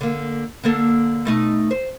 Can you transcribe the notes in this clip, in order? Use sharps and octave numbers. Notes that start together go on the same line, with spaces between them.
D3 A#3
D3 A#3 A4
B2 A3 D#4
C5